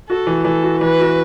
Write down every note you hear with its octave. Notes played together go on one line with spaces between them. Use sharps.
F#4 A4
E3
E3 A4
F#4
E3 B4
F#4